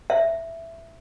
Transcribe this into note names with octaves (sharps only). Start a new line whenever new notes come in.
E5